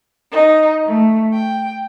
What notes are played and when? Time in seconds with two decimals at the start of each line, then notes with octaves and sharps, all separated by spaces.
0.31 D#4
0.87 A3
1.33 G5